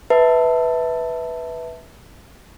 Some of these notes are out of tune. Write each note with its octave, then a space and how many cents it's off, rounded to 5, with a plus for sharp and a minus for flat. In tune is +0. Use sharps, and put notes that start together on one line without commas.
B4 +0 E5 -15 A5 +15